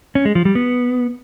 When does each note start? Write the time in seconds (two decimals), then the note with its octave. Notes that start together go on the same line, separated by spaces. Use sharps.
0.15 C#4
0.25 G#3
0.35 F3
0.45 G3
0.55 B3